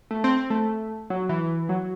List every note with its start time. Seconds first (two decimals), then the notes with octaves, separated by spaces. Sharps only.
0.11 A3
0.24 C4
0.37 C4
0.50 A3
1.10 F#3
1.29 E3
1.69 F#3